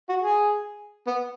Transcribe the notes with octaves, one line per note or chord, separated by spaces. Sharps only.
F#4
G#4
B3